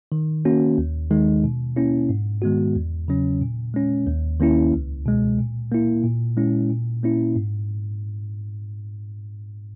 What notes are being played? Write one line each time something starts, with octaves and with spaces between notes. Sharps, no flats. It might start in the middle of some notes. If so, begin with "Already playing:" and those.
D#3
A#3 C#4 F#4
D#2
D#3 G#3 D#4
B2
A#3 C#4 E4
G#2
D#3 G#3 B3 F#4
E2
C#3 F#3 C#4
A#2
G#3 C#4
D#2
D#3 A#3 C#4 E4
C#2
B2 G#3
A#2
A#3 E4
A#2
G#3 C#4 E4
A#2
A#3 C#4 E4
G#2